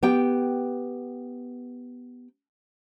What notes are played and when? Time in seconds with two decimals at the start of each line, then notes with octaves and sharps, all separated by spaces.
0.03 B3 G4 G5